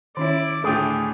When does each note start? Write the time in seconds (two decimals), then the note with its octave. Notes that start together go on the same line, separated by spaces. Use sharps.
0.17 D#3 C#4 E4 C#5 D5
0.64 D2 A2 D4 G#4 G5